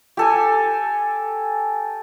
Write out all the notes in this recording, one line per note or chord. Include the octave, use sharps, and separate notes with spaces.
G4 A4 G#5